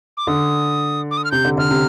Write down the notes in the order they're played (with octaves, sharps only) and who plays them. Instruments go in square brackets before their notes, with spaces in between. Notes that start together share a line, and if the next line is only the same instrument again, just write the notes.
[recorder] D6
[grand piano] D3 [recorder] D#6
[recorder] D6
D#6
F6
[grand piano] C3 [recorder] G6
[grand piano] D3
[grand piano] D3 [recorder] F6
[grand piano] C3